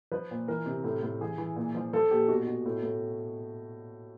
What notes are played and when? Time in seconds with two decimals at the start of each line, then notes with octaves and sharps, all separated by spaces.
0.12 F3 B4
0.31 A#2
0.48 E3 A#4
0.66 C3
0.84 A2
1.03 A2
1.21 E3 G#4
1.38 E3
1.56 A#2
1.75 F3
1.93 F3 A4
2.11 A#2 G4
2.28 B2 F#4
2.47 B2
2.66 A2
2.83 A2